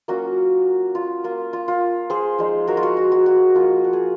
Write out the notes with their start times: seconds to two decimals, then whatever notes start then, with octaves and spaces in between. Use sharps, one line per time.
0.08 F#3 A#3 C#4 F4 F#4
0.95 F4
1.24 A#3 F4
1.53 F4
1.68 F4
2.10 G#4 C5
2.39 F3 G#3 D#4
2.67 F#4 A#4
2.77 F4
2.83 F#4
2.97 F#4
3.12 F#4
3.26 F#4
3.55 F3 A#3 F4
3.84 F#4
3.93 G#4